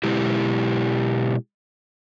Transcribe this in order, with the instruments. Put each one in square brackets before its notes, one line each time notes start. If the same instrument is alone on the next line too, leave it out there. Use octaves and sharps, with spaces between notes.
[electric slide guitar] B2 G#3 E4 G4